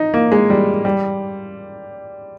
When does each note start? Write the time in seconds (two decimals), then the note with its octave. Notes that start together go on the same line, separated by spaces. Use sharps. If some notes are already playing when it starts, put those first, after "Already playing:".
Already playing: D#4
0.14 A#3
0.32 G#3
0.50 G3
0.85 G3